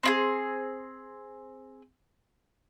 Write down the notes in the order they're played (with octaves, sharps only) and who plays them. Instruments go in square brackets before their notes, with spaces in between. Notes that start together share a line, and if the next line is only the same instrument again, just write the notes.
[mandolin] C4 E4 G#4